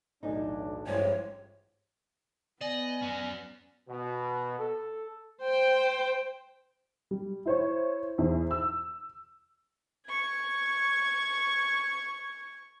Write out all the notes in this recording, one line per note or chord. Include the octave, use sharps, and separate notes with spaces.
B1 E2 A2 D4 D#4
A1 G2 F3 G#3 C#5
B3 D5 D#5 G#5
C#4 F#4
B2
A4
C5 G5
G3
E4 C5 C#5
E2 C5
E6
C#6 G#6